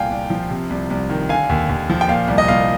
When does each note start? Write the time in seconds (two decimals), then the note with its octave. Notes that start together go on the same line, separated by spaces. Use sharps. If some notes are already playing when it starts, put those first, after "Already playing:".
Already playing: C2 A#2 F5 G5 G#5
0.10 C2
0.30 F3
0.50 C3
0.70 C2
0.91 C2
1.10 D#3
1.29 D3 F5 G#5
1.49 D#2
1.69 D#2
1.90 F3
2.01 G5
2.08 A#2 F5
2.28 C2
2.38 D#5
2.48 C2 F5